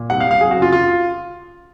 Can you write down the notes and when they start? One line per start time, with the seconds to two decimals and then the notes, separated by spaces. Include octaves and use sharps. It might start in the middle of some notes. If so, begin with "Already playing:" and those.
Already playing: A#2
0.10 C2 F#5
0.20 F5
0.25 C2
0.31 F5
0.41 F#3 G#4
0.51 F#4
0.57 C#3
0.62 F4
0.72 F4